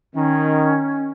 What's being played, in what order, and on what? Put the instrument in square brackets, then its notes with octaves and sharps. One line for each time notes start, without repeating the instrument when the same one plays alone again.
[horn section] D#3 [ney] C#4